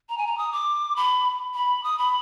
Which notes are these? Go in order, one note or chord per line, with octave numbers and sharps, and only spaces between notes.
A#5
G#5
A#5
D#6
D6
B5
B5
D#6
B5